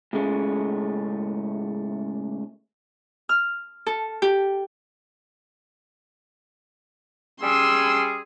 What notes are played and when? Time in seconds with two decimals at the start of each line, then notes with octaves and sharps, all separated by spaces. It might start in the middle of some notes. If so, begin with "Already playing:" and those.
0.13 A2 C#3 G#3 A3 C#4
3.29 F6
3.86 A4
4.22 G4
7.42 G3 C#4 G#4 C6 E6